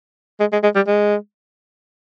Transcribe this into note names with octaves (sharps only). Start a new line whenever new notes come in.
G#3
G#3
G#3
G3
G#3